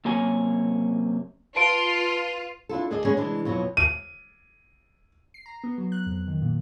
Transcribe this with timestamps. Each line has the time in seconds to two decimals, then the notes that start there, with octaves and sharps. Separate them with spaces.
0.05 F#2 C3 A#3 C#5 G#5
1.56 F4 B4 A5 C6 C7 D7 D#7
2.69 D4 E4 F4 A4
2.90 D2 G#4 A4 D5 D#5
3.05 G3 G#3 B3 C#4 G#4
3.17 C3 E3 G#3 D4
3.45 F2 B2 E3 F#3
3.77 D#7
5.34 C7
5.46 A#5
5.64 B3
5.78 F#3
5.92 F#6
6.06 F2
6.28 D#3
6.42 A#2